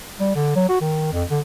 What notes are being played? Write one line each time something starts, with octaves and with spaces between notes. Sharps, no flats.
G3
D3
F#3
F#4
D#3
F2
D3